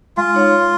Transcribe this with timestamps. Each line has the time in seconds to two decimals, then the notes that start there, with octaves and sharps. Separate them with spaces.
0.17 G#3 F4
0.34 D#4 C#5 F5
0.52 G#3